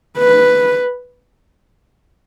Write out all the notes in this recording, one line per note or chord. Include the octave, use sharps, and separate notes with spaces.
B4